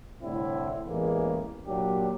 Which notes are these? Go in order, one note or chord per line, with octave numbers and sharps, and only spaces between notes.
C2 A2 D3 C4 E4
A1 E2 E3 G#3 A#3
A#2 F#3 D4 G4